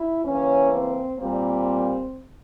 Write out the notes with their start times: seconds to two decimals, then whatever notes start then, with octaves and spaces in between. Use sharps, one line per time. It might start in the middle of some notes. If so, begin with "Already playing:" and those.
Already playing: E4
0.25 C#3 E3 A#3 C#4
0.72 C4
1.18 A#2 G3 A#3 C4